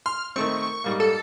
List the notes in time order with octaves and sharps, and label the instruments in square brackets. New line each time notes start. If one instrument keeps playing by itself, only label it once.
[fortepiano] C6 [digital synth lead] F6
[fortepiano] D#3 A3 C4 [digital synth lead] C#6
[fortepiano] G#2 G3 A#3
[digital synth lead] A4